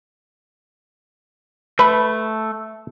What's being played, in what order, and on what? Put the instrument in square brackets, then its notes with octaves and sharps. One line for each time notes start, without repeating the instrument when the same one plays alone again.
[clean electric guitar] A3 [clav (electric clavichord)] B4